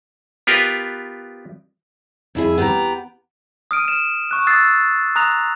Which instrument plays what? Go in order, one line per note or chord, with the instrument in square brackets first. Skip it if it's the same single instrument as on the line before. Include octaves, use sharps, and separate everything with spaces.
[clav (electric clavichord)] B3 F4 G4 A#4 B4
[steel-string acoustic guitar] F2 E4 G#4
B3 G4 A#5
[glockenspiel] D#6 F6 D7 D#7
F6 E7
C#6 F#6
D#6 E6 F#6 A6 C7
A#5 D#6 F#6 A#6 F7